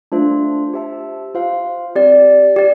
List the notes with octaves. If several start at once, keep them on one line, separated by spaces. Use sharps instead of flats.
A3 D4 F4 C5
G4 C5 E5 A5
F4 C5 F5
C4 G4 D5
G4 D5